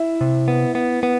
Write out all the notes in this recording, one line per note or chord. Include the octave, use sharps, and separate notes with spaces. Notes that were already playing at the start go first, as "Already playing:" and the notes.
Already playing: E4 E5
C3
B3
B3
B3